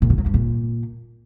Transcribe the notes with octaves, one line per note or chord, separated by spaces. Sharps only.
A#2
D3
F#3
G2
A#2